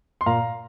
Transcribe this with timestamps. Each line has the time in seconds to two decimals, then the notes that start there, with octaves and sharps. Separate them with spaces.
0.21 C6
0.26 A#2 F5 A#5